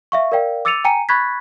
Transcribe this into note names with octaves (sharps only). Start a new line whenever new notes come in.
E5 F5 C#6
A#4 D5 F5 G5
D6 E6 A6 C#7 D#7 F7
G5 G#5 A#5 C#7 D#7
B5 C#6 F#6 G#6 A6 B6